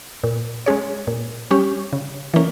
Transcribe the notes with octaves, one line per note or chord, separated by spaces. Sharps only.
A#2
G#3 C#4 G#4 C#5
A#2
G3 C#4 G4 C#5
C#3
E3 A#3 C#4